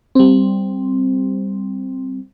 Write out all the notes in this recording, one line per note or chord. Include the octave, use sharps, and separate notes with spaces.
G3 C4